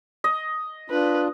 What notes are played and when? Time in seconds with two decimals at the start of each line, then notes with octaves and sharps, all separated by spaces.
0.24 D#5
0.90 D4 F4 B4